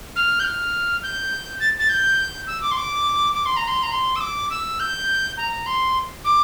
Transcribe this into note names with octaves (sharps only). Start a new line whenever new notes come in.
F6
G6
F6
G6
A6
A6
G6
E6
D6
C6
D6
D6
C6
A#5
C6
A#5
C6
E6
D6
E6
G6
A#5
C6
D6